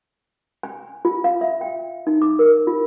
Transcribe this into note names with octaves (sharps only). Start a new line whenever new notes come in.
G#5
F4
F5
E5
G5
D#4
D6
A#4
F4